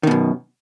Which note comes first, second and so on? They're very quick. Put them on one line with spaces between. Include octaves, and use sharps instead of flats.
D#3 B2 F#2